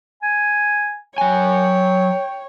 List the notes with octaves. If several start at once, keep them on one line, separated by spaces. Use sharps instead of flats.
G#5
F#3 C#5 G5 G#5